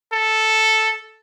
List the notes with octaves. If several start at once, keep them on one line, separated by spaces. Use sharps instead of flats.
A4